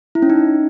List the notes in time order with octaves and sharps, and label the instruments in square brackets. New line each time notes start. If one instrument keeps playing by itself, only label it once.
[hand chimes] E4
C#4
D#4